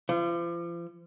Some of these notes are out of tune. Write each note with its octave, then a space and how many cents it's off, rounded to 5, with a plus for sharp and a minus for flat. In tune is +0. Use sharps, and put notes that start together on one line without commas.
F3 -40